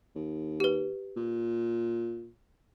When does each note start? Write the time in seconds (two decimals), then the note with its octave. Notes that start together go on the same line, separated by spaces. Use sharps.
0.15 D#2
0.60 G4 B4
1.16 A#2